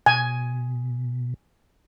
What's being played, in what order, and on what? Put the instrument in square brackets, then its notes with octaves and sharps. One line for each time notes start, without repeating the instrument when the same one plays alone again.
[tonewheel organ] B2 [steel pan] G#5